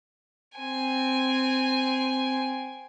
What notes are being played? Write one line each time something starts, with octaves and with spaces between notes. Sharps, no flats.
C4 G#5